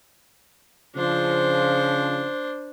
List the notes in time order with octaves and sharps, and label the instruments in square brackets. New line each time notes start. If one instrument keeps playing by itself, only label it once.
[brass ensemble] C#3 F3 [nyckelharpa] D4 C5